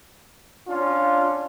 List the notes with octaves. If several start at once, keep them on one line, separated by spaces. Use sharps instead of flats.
C#4 D4 F4